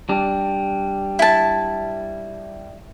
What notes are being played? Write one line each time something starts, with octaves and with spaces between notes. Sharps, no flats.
G3 D4
E4 A5